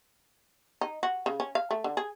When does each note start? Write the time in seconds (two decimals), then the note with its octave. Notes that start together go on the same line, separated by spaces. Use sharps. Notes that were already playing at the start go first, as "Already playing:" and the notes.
0.81 D#4
1.03 F#4
1.26 C#3
1.40 C#4
1.55 F5
1.71 A3
1.84 D3
1.97 G#4